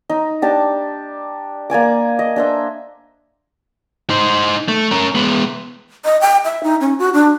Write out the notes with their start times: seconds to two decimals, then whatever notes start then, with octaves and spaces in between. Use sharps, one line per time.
0.10 D#4
0.42 D4 G4 A5
1.70 A#3 D5 G#5 D6
2.19 D#5
2.36 D4 C5 E5
4.10 D#4 C5
4.68 A3
4.91 C#4 A#4
5.15 G#3 B3
6.05 D#5
6.21 G5
6.44 E5
6.63 D#4
6.81 C#4
6.99 F#4
7.14 D4